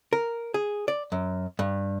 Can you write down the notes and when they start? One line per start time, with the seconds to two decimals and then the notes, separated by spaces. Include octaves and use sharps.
0.13 A#4
0.54 G#4
0.88 D5
1.12 F#2
1.59 G2